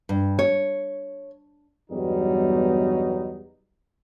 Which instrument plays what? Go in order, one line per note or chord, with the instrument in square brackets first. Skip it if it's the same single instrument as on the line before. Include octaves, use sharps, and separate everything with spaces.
[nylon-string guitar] G2
C#5
[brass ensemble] E2 G2 B2 F#3 G3 D#4